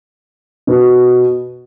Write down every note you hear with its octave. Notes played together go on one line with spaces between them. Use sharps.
B2 B3 F#4